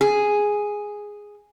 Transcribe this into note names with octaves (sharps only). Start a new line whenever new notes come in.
G#4